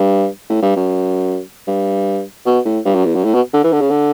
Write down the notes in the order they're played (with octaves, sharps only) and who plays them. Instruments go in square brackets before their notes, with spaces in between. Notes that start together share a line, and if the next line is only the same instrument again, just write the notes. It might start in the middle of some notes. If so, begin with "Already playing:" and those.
Already playing: [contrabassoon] G2
A2
G2
F#2
G2
B2
A2
G2
F#2
E2
F#2
A2
B2
D3
E3
D3
C#3
D3